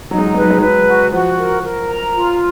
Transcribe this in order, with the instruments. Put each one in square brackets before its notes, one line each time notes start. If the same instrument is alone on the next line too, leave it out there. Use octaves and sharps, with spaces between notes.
[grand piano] F#3 [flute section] D#4
[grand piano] G#3
F#3
[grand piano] G#3 [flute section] B4
[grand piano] F#3
G#3
[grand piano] F#3 [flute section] B4
[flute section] F#4
[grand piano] F3 [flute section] F#4
[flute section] A#4
A#4
A#5
F4